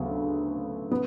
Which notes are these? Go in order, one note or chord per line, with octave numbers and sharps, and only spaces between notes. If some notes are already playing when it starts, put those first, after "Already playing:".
Already playing: D2 C#3 F#3 B3
B3